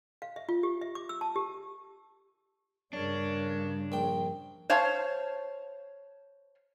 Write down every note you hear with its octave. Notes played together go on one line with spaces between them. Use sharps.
F5
E5
F4
G4
E5
D6
E6
A5
G4
G2 C#3 D4 G#4 A#4 C#5
A#1 G5
C5 C#5 F5 A5